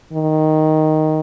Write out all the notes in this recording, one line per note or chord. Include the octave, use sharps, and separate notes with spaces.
D#3